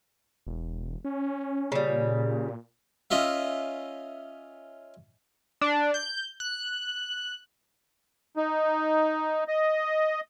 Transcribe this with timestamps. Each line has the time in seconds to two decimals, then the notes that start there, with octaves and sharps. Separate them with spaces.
0.47 E1
1.05 C#4
1.72 A#2 C#3 G3
3.11 C#4 F4 D#5 E5
5.61 D4
5.94 G6
6.40 F#6
8.37 D#4
9.48 D#5